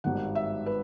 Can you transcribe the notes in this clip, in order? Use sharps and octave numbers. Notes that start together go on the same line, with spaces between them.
G#1 G2 D#3 F#5
E5
B4